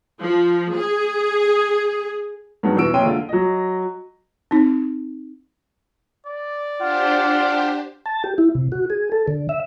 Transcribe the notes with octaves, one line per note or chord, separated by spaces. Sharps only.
F3
G#4
G2 F#3 G#3 B3 D#4
E2 B2 E6 D7
F#1 C#4 G4 G5 C6 D#7
D3 G#3 F4
F#3 D#5
C4 D#4
D5
D4 F4 G4 C5 F#5
A5
G4
E4
C3
F#4
G#4
A4
D3
E5